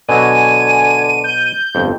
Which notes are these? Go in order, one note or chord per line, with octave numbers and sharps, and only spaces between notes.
B2 D3 F#3 G#5 D#7
G6
G1 F2